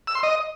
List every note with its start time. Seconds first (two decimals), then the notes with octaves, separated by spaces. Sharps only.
0.07 E6
0.15 C6
0.23 D#5